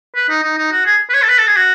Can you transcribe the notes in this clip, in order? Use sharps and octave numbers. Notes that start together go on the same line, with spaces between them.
B4
D#4
D#4
D#4
F#4
G#4
B4
C#5
A4
B4
A4
G#4
F#4